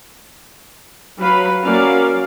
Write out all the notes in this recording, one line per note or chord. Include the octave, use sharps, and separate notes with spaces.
F#3 B4 F5 B5
F#3 A#3 C#4 A#4 D5 F5